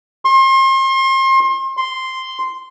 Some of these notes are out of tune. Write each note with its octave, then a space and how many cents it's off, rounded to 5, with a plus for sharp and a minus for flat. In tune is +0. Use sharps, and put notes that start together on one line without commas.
C6 +35
C6 -5